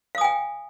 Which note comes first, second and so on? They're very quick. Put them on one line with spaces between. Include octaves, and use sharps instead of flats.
F5 D#6 G#5 G5